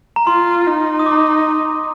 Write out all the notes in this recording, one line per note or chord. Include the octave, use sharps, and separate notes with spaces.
A#5
F4 C6
D#4
D#6
D6